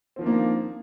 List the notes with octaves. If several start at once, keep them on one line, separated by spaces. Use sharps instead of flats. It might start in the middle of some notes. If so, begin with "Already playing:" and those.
D#3 F3 A#3 C4 D4